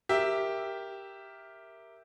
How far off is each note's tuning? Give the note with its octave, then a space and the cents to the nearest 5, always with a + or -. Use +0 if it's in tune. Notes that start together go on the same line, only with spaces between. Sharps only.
G4 +0 A#4 +0 E5 +0